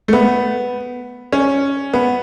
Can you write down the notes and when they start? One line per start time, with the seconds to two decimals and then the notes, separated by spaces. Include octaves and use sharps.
0.08 A3
0.13 B3
1.32 C#4
1.94 B3